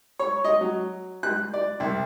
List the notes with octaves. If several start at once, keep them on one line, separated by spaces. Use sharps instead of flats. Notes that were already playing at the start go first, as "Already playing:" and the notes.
C#5
D#5
F#3
F#6
D5
C2